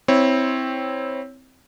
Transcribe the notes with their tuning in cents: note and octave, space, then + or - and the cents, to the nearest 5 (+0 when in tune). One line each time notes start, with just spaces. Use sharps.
C4 +0 E4 -15 C#5 +0